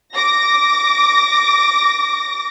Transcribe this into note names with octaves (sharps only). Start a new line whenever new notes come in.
D6 A#6